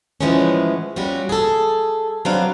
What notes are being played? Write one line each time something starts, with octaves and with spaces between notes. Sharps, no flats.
A2 E3 F3 G#3 B3 C#4
C3 G3 C#4 F4 F#4
G#4 A4
F#3 G3 C4 D4 B4 F5